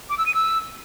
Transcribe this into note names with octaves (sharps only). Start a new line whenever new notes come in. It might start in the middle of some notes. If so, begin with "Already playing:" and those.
D6
E6
D#7
E6